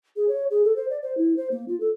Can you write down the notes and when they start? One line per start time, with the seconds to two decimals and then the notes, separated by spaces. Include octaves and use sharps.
0.16 G#4
0.29 C#5
0.50 G#4
0.64 A4
0.76 C5
0.90 D5
1.02 C5
1.17 E4
1.37 C5
1.52 A#3
1.68 F4
1.80 A4